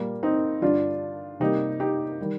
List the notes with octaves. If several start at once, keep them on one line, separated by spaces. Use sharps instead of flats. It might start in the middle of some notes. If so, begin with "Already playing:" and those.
Already playing: A#2 G3 A#3
C4 D#4
G2 D3 G3 D4 F4
C3 G3 A#3 D#4 G4
D#4 G4
D#3 G3